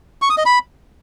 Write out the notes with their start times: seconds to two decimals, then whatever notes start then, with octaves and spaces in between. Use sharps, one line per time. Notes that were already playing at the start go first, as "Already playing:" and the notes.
0.22 C#6
0.30 D#6
0.38 D#5
0.46 B5